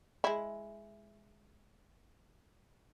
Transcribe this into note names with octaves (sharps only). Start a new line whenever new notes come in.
G#3 E4